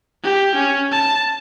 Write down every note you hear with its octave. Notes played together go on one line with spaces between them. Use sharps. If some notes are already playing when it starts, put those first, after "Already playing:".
G4
C#4
A5